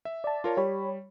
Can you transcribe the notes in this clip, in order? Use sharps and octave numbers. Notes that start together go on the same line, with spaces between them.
E5
D5 A5
F4 A#4 C#5
G3 G4 C#5 B5